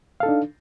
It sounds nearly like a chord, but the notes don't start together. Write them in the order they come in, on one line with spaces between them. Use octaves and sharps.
F5 A4 D#4 D4